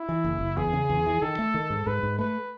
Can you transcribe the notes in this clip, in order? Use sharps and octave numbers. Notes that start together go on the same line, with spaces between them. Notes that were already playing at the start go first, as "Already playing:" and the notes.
Already playing: E4
E3
F#1
F#1
E2 G#4
C#3
E2
E3
D#3 A4
A3
D#3
G#2
G#2 B4
G#2
A3 B4